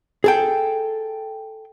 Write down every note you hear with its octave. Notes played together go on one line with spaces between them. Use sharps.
G#4 A4 G5